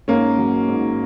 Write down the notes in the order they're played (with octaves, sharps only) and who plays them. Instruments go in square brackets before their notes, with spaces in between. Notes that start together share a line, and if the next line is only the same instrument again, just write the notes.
[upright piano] G#2 A#3 C#4
F#3
G#2